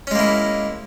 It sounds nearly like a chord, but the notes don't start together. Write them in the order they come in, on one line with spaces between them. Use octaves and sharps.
C#4 G#3 A#3 E4